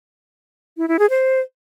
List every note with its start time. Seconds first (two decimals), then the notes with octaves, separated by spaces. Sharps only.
0.77 E4
0.88 E4
0.99 G#4
1.10 C5